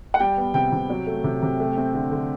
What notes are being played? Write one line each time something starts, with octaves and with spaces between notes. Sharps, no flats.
F#5
G3 G5
B3
C3 G5
C3
F#3
A3
C3
C3
A3
C4
D3
D3